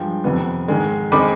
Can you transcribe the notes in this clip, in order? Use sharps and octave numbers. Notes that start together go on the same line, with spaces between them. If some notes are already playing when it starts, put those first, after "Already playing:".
Already playing: G2 F3 G#3 G5
F2 C3 D#3 B3
G#2 D#3 G#3
D#3 G#3 C4 D#4 B5 D6